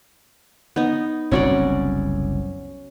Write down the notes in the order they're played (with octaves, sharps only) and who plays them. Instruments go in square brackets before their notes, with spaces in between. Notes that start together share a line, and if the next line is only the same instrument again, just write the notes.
[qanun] B3 D#4
[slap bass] F#1 C2 C4 [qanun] C#4 F#4 D5